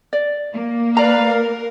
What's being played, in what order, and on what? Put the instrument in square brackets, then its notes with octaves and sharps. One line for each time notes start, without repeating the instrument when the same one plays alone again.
[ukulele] D5
[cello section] A#3
[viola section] B4 F5 [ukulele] D5 A#5
[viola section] A#4